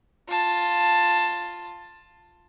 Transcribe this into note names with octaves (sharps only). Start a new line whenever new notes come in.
F4 A5